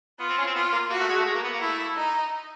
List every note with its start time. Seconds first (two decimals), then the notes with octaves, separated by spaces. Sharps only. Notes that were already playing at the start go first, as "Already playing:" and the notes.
0.20 B3 F4
0.29 C4
0.38 C#4
0.47 C4
0.55 B3 F4
0.72 A#3
0.90 A#3 F#4
1.00 A3
1.09 G#3
1.17 A3
1.26 G#3
1.35 A#3
1.43 B3
1.52 A#3
1.61 A3 E4
1.96 D#4